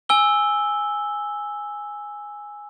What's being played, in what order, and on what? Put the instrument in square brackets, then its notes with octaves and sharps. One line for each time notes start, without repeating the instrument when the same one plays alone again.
[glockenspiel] G#5 E6 G7